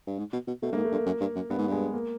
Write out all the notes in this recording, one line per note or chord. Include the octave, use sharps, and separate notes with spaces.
G2
G#2
B2
B2
B2 A3
G2 A#3
G#2
A3
G2
A#3
F#2
G2
F#2
G2 B3
G#2
G2 G#3
A#3